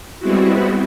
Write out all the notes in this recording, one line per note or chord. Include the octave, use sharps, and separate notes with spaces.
G3 G#3 B3 C4 E4 F#4